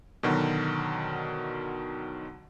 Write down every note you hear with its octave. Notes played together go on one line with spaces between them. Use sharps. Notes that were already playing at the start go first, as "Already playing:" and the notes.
B2 D3 D#3 F#3